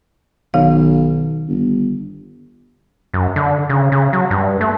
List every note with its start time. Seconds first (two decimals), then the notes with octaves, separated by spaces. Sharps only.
0.54 B1 D#3 F5
1.48 G1
3.14 F#2
3.36 D3
3.69 C#3
3.92 C#3
4.13 F#3
4.31 G2
4.61 A3